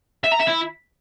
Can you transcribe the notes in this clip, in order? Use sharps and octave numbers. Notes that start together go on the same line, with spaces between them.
E5
A#5
E5
E4